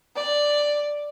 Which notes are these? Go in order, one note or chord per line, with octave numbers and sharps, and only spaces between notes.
D5